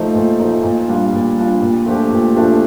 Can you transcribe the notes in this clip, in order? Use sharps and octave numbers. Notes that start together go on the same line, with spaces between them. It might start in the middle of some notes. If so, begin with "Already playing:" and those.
Already playing: F3 A3 D#4
A#2
F3 A3 D#4
A#2
G3 D4 F4
A#2
G3 D4 F4
A#2
F3 A3 D4 G4
A#2
F3 A3 D4 G4